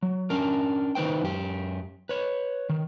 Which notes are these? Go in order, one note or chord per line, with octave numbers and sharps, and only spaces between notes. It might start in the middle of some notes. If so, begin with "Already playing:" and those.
F#3
C#4 D4 A#4
D#3 D#4 B4 C5 G5
F#2 G4
B4 C#5
D#3